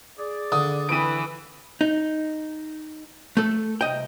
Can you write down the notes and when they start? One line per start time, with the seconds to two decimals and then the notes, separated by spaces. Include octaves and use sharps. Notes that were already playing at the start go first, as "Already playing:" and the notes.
0.18 G#4 D5
0.52 D3 D#6
0.89 E3 C4 B4 D7 D#7
1.81 D#4
3.37 A3 A4
3.81 C2 D#5 G5